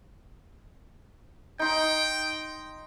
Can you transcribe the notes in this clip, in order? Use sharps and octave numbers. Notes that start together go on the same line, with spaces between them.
D#4 G5 C6